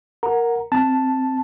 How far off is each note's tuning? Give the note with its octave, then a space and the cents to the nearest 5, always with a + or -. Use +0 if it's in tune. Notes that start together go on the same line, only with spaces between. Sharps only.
A#4 +0 F#5 -5 A#5 +0
C4 +0 A5 +0